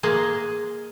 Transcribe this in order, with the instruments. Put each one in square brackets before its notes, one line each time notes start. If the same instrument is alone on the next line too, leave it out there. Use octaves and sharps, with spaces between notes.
[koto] G#3 A#3 G#4